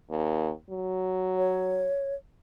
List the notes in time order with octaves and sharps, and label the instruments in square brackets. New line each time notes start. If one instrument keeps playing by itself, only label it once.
[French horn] D#2
F#3
[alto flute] C#5